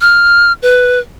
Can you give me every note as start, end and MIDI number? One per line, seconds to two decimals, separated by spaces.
0.01 0.53 89
0.62 1.00 71